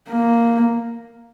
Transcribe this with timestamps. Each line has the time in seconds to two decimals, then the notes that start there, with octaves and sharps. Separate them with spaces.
0.09 A#3